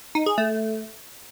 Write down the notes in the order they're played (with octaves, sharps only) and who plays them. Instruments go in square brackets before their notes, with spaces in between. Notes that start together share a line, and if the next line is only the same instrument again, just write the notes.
[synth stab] D#4
G#4
A3